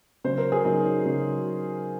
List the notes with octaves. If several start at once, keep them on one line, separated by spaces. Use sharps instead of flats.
C#3 F#3 C5
A#4
G#4
C#3 F#3 D#4
C#3 F#3